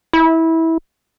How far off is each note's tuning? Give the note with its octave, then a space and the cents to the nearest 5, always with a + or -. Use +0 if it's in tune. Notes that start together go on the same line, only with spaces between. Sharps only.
E4 -20